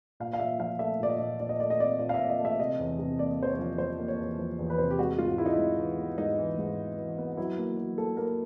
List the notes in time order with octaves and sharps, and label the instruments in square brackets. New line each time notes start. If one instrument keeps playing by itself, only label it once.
[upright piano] A#2 F5
F5
A#2 E5
F3 F5
A3 E5
A#2 D5
D#5
A#2
A#2 D5
D#5
A3 D5
D#5
C4 D5
A#2 D5
F5
E5
A#2
D#5
A3
E5
C3 D#5
E2
C3
A#3 D5
E2 C5
C#5
F3
F3 C5
A#3
C#5
E2
F3
E2
B4
C3 C5
G4
G#3 F#4
G#2 F4
G#3 E4
D#4
E4
G#2
E3
B3
G#2 D#4
E3
G#2
E3
E3
B3
F#3 E4
A#3
F#3
A#3 A4
A#3 A#4